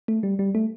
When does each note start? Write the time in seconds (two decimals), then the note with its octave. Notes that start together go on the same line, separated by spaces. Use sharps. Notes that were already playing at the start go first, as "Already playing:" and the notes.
0.08 A3
0.23 G3
0.39 G3
0.55 A3